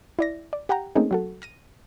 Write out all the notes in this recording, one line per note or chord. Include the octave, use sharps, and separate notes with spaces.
E4 D5 A#6
D5
G4 F#5 G5 A#5
A3 A#3 C4 C#4 D#4 G#4
F#3 F#4 A4
F6 A#6 D#7